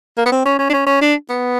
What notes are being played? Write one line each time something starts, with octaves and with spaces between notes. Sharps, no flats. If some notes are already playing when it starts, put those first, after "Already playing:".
A#3
B3
C4
C#4
C#4
D4
C#4
C#4
D4
B3